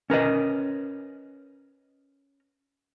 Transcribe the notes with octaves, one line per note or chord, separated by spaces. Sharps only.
C#4 A#4 B4 D#5